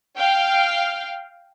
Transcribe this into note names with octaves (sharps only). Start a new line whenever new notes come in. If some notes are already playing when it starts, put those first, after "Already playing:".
F5 G5